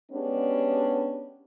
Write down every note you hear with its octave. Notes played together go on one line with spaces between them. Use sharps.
G#3 B3 C#4 D4 G4